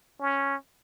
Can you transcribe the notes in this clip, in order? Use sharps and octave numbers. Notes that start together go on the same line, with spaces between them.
C#4